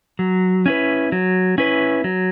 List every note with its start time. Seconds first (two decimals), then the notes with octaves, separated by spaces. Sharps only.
0.19 F#3
0.66 C#4 E4 B4
1.12 F#3
1.58 C#4 E4 B4
2.04 F#3